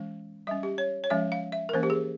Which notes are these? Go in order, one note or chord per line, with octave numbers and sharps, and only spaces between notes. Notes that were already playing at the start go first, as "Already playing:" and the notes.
Already playing: E3 G#3 C#4
G3 C#4 E5
G4
C#5
C#5
F3 G#3 C#4 E5
F5
E5
A#4
E3 A#3 C#4 C5
G4
G#4